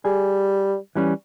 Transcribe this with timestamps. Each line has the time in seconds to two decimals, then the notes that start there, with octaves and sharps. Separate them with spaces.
0.05 G3 G#4
0.95 E3 G3 C#4